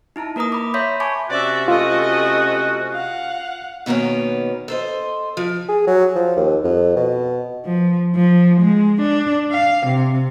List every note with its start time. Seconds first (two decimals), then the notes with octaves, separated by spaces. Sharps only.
0.16 D#4 E4 A5 A#5
0.36 A#3 A#4 B4 A#5 D#6
0.52 B5 D6
0.74 C#5 E5 B5 C6 G6 B6
1.00 G#5 A5 B5 C#6 D6
1.30 C3 C#4 F#4 D5 E5
1.68 A3 F4 D#5
2.92 F5 F#5
3.86 B2 D#3 A#3 B3 C#4
4.68 A4 C5 D#5
5.37 F3
5.69 G#4
5.87 F#3
6.15 F3
6.36 D#2
6.64 F2
6.96 B2
7.65 F3
8.15 F3
8.62 G#3
9.02 D4
9.52 F5
9.87 C3